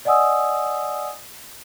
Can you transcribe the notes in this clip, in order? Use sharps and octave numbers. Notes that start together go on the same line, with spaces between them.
D5 D#5 F#5 G#5 D#6 E6